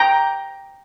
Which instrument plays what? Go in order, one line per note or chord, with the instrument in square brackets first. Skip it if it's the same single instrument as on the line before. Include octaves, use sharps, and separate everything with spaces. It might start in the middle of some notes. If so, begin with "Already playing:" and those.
Already playing: [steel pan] G5 A#5